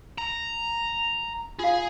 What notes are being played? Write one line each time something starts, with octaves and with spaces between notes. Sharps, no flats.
A#5
F4 G#4 F5